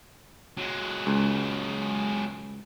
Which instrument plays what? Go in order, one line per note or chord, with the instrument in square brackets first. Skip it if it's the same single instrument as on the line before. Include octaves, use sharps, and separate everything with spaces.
[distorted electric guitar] F#3 G#3
[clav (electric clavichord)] C#2